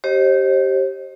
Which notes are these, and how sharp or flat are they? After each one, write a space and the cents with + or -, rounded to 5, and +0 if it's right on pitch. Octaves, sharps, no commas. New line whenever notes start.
G4 -20 C5 +35 D#5 +0